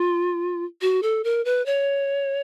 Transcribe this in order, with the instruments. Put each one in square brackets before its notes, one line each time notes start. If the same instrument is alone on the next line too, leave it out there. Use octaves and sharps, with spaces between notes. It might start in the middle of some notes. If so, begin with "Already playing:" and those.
Already playing: [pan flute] F4
F#4
A4
A#4
B4
C#5